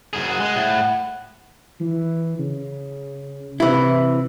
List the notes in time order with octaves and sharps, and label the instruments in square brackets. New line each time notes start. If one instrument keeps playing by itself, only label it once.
[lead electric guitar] F#2 G#4
[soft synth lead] F#5
[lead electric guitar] G#3
A2
[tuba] E3
C#3
[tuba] C3 [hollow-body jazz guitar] E3 E4